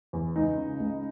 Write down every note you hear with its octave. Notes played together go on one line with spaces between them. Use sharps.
E2
C#2 D#4
C#3
C#2